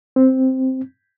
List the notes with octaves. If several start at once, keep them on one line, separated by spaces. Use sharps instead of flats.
C4